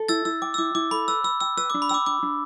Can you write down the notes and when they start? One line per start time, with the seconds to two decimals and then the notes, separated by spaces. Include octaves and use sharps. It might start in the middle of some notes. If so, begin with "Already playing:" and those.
Already playing: A4
0.09 E4 E6 A6
0.25 E4 E6
0.42 G5 D6
0.54 E6
0.58 E4 D6
0.75 E4 D6
0.91 A4 B5
1.08 B4 E6
1.24 B5 E6
1.41 G5 E6
1.57 B4 E6
1.70 D4 D6
1.82 B5
1.89 G5 D6 E6
2.06 D4 D6
2.23 D4